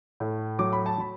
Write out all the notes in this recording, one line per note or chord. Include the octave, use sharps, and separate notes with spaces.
A2
F#3 D6
B5
A5
F#3 B5